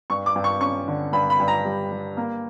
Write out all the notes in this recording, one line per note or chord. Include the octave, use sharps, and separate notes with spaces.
G2 C#6
D6
G2
C#6
C#4 C#6
D3
G2 B5
B5
G2
A#5
G3
G3
A#3